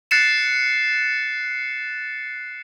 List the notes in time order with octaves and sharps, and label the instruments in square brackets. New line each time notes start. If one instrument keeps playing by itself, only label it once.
[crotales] F#6 A6 C7 C#7 E7